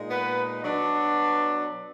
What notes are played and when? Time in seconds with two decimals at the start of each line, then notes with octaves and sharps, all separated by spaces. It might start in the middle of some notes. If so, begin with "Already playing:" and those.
Already playing: A#2 G#3 D#4
0.11 B3 B4
0.63 B2 F#3 B3 D4